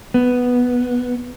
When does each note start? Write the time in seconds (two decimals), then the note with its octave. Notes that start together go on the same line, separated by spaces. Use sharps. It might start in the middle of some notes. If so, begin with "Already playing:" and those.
0.14 B3